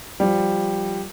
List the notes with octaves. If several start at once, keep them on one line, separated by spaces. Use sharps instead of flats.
F3 G3